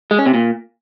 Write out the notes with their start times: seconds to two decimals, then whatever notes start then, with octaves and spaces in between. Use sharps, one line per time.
0.11 G#3
0.19 C#4
0.26 C3
0.34 A#2